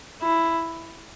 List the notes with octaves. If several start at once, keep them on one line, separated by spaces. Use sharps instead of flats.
E4